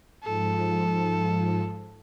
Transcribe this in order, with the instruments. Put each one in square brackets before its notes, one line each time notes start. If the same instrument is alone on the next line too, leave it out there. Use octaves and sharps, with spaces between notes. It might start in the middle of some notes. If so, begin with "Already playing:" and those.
[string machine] G#2 F3 [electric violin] A4